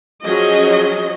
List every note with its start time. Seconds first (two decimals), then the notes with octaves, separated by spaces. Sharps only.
0.24 F3 F#3 C#4 F#4 G#4 D#5